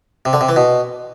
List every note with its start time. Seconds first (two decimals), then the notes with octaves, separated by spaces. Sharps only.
0.25 C3
0.33 D3
0.41 C3
0.49 E3
0.56 B2